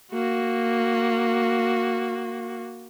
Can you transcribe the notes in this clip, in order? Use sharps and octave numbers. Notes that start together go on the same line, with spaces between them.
A#3 F#4